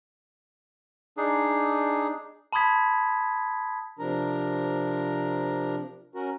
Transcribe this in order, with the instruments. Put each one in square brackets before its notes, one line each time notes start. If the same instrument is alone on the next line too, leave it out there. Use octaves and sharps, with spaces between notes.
[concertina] D4 D#4 G#4
[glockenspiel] A5 B5 C6 D#6 G#6 B6
[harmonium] C3 F3 D4 A#4 A#5
C#4 F#4 A#4